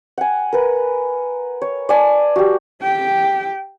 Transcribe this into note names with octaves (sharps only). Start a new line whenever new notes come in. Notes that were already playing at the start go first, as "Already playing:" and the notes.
F#5 G#5
A#4 B4
C#5
D5 G#5 A5
F#4 G4
G4 G5